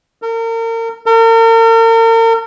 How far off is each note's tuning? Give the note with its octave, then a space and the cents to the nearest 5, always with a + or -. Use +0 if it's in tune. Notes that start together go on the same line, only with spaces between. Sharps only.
A#4 -35
A#4 -40